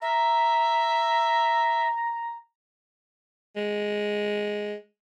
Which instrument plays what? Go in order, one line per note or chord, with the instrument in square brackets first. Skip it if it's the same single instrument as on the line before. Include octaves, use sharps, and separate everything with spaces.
[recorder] E5 [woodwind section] A#5
[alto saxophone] G#3